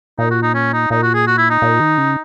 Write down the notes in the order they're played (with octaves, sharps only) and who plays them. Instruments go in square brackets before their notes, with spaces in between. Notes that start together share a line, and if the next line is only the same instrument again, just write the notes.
[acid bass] A#2 [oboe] D#4
[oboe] F#4
D#4
C#4
D#4
[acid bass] A#2 [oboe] D#4
[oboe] F#4
G#4
F#4
E4
D#4
[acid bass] A#2
D#3
C#3